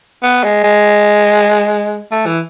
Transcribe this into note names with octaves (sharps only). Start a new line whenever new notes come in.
B3
G#3
G#3
A3
E3